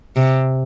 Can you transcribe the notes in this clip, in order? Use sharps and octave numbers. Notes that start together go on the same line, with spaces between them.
C3